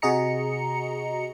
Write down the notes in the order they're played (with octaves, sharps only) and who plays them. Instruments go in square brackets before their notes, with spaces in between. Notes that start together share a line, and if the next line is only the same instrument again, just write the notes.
[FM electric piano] C3 F#4 G#4 D#5 A#5 C#7